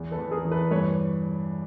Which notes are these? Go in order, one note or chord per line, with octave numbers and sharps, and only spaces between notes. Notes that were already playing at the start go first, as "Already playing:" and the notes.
Already playing: E2
A4 B4
E2
G#4 A#4
E3
A4 B4
G2 B4 C#5